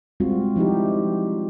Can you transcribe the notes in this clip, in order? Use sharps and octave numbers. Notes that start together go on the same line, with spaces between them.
G3 G#3 C4 F4 F#4
F3 D#4 E4 G4